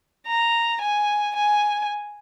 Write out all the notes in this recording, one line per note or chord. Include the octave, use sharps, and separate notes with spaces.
A#5
G#5
G#5